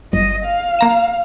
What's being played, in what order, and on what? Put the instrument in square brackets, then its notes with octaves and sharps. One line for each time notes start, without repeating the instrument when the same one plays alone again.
[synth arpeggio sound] G1 [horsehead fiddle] D#5
[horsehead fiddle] F5
[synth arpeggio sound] A#3 A#5 E7